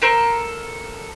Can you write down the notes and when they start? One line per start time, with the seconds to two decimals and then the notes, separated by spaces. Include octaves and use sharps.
0.02 A4 A#4 C5